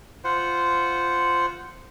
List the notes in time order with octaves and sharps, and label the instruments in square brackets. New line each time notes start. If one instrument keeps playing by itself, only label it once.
[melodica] F4 C5 F#5